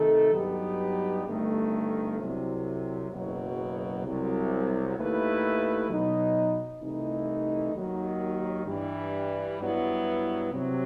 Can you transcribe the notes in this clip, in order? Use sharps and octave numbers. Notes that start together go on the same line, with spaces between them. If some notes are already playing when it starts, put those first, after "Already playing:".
Already playing: C3 D#3 A3 D#4 A4
G2 F#3 B3 D#4 G4
G1 G2 D#3 A3
C2 C3 F#3
F#1 E2 B2 F#3
C2 C3 F#3
D#2 D#3 A3 E4 B4
B2 F#3 B3 D#4
C2 C3 E3 A3 D#4
D#2 D#3 F#3
G2 E3 G3
G2 F#3 B3 E4
C3 F#3 C4